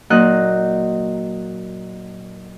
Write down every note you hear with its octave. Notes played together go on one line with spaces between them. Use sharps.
A#2 F#3 D#4 D#5 F#6